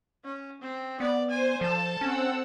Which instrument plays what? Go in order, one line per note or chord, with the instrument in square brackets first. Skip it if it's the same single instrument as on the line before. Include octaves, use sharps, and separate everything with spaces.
[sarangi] C#4
C4
[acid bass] B3 [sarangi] D5
[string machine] C5 [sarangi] G#5
[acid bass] F3 [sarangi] A4 [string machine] A5
[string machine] C4 F#5 E6 [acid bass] C#4